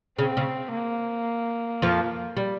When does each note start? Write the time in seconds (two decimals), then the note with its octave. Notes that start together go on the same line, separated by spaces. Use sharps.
0.18 C#3 C4
0.37 C#3
0.73 A#3
1.82 F2 F3
2.37 G3